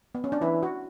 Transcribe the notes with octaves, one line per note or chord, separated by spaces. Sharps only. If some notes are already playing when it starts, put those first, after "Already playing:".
B3
C#4
D4
E3 E4
F#4